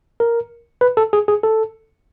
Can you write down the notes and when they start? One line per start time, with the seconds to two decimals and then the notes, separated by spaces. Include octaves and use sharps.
0.20 A#4
0.81 B4
0.97 A4
1.13 G#4
1.28 G#4
1.44 A4